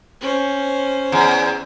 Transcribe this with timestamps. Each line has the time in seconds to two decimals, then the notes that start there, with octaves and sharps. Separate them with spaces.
0.21 C#4 C5
1.12 E2